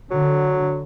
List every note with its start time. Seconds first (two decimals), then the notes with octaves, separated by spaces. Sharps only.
0.11 D3 F#3